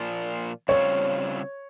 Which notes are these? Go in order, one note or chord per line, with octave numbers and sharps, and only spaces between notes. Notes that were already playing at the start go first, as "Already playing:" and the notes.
Already playing: A#2 F3 A#3 F4
C#3 G3 C4 F4 C#5